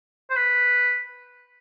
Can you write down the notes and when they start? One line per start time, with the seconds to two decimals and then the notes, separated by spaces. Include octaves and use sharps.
0.30 C5
0.36 B4